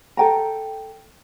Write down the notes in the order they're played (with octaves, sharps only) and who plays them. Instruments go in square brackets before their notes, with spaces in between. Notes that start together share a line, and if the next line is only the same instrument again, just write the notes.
[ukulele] A4 G5 A#5